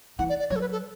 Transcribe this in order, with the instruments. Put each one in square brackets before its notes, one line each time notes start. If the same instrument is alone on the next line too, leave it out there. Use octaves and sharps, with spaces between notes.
[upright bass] E3 [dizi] F#5
[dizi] D5
D5
[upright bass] F#3 [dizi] C#5
[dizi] A4
B4
A4